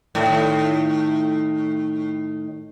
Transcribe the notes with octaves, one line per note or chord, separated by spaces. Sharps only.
A2 D#3